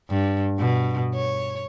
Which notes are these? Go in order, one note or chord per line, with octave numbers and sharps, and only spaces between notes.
G2
B2
C#5